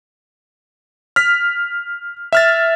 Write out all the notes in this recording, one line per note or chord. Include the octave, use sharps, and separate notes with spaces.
F6 B6
E5 F6 A6